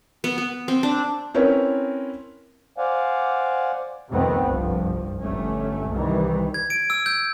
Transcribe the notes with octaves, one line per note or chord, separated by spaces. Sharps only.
B3
B3
C4
D4
C4 C#4 E4 A#4 B4 C#5
C5 D5 F5 F#5 G#5
F2 C3 D#3 A3 B3 C4
F1 C2 G2 F3
G1 A3 C#4
C2 D#3 E3 G3
G#6
D7
E6
G6